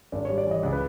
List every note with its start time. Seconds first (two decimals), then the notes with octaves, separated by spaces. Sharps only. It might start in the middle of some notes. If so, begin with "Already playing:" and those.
0.12 G#1 D5
0.25 G3 C#5
0.38 D5
0.47 E3 D#5
0.63 C#2
0.73 B4